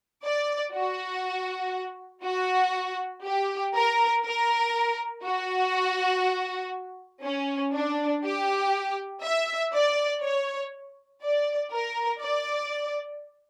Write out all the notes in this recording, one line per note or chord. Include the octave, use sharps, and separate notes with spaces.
D5
F#4
F#4
G4
A#4
A#4
F#4
C#4
D4
G4
E5
D5
C#5
D5
A#4
D5